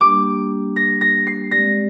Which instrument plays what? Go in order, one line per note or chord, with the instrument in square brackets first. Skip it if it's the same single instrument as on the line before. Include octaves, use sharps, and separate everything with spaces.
[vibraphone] G3 A#3 D4 G4 [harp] D6
[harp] A#6
A#6
C7
[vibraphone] G#3 C4 G4 D5 [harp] A#6